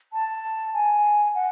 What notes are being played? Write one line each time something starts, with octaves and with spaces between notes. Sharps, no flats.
A5
G#5
F#5